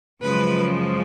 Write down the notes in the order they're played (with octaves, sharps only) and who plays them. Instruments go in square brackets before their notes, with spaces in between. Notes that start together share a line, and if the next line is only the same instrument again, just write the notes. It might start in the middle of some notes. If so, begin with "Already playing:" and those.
[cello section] F#2 C#3 F3 G#3 B4